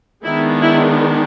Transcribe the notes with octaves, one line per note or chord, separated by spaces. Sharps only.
D#3 G#3 B3 D4 E4
E4